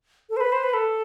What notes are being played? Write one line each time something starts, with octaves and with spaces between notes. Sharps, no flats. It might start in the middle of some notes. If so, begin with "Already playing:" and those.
A4
C5
B4
C5
B4
A4